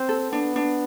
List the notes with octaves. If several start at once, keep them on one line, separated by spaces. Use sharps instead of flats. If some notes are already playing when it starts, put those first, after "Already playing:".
Already playing: C4 C5
A4
B3 D4
D4